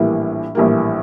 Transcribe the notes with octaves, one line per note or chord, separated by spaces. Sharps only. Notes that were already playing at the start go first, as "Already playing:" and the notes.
Already playing: A#1 A2 E3 G3 A#3
A#1 A2 E3 G3 A#3